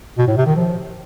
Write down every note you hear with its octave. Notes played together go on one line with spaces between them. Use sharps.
B2
A2
C3
D#3
F3